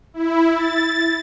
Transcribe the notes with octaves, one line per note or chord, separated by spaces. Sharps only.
E4
A6